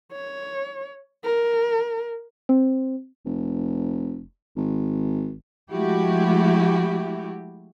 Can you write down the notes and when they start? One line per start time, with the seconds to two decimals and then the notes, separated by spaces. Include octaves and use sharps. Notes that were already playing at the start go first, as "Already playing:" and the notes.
0.12 C#5
1.24 A#4
2.49 C4
3.26 F1
4.56 G#1
5.71 F3 G#3 A3 E4 F#4 G4